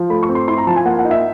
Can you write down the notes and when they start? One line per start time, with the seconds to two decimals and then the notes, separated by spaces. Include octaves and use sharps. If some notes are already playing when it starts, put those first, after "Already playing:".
Already playing: F3
0.10 A3 B5
0.23 C#6
0.29 C4
0.35 C6
0.48 E4 C6
0.58 A#5
0.67 F3 A5
0.76 G#5
0.85 A#3 F#5
0.99 F#5
1.05 D#4
1.11 E5